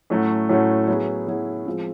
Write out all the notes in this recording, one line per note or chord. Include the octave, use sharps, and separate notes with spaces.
A2 F#3 A3 C#4 F#4
A2 F#3 A3 C#4 F#4
F#3 B3 E4 G#4
F#3 B3 E4 G#4
F3 G#3 C4